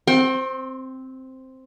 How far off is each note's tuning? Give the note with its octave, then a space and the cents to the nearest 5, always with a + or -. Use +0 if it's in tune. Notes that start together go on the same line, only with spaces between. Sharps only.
C4 +0 G5 +0 C6 +40